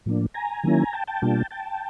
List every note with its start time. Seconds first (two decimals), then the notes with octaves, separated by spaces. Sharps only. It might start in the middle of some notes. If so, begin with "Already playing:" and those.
0.06 A2 F3 A#3 D4
0.34 G#5 A#5
0.64 D#3 F#3 A#3 C#4 E4
0.93 G5 A5
1.07 G5 A5
1.22 B2 G3 A#3 D4 F4
1.51 G5 A5